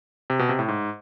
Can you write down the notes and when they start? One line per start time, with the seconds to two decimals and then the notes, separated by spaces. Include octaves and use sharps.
0.30 C3
0.39 B2
0.49 C3
0.59 A2
0.68 G#2